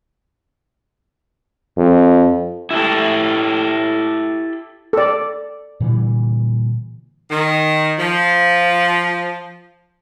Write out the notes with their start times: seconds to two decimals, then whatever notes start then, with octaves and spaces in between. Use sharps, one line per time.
1.78 F2
2.71 E4 G4 A4
4.93 A4 D5
5.80 A#2 D3 E3 G3
7.31 D#3
7.99 F3